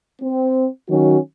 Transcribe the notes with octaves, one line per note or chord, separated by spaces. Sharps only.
C4
D#3 F#3 C#4 F#4